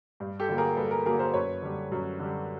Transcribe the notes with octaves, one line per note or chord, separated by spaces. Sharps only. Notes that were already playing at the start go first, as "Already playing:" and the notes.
G2
G4 A4
D3 F#3 A#3
G#4 A#4
G2 A4 B4
G#4 A#4
D3 F#3 A#3 G#4 A#4
A#4 C5
F#2 B4 C#5
D3 G3
F#2
D3 G3